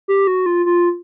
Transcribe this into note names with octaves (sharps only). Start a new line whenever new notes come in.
G4
F#4
F4
F4